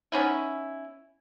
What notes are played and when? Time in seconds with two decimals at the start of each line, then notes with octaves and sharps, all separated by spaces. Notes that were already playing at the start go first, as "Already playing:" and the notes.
0.12 B3 C#4 D#4 E4